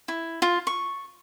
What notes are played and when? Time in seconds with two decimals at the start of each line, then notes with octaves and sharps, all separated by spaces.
0.08 E4
0.42 F4
0.67 C#6